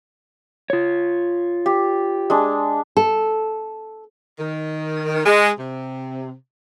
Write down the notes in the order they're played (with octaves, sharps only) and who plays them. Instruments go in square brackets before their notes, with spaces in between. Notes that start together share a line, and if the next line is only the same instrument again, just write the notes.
[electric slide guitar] F4 C#5
[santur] G4
G#3 D4
[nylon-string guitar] A4
[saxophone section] D#3
G#3
C3